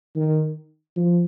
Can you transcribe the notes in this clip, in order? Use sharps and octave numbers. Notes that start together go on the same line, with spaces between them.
D#3
F3